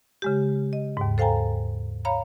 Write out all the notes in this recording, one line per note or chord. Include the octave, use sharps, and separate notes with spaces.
C#3 G#3 G4
D#5
D#2 G#2
A4 C5 F5 G5 G#5 A#5
C#5 F5 A#5 B5